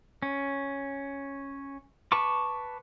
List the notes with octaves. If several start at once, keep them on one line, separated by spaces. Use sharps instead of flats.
C#4
B4 A5 C#6 D6